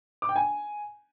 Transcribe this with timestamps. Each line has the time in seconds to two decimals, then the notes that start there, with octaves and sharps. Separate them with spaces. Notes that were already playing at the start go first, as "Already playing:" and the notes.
0.22 D6
0.29 G5
0.36 G#5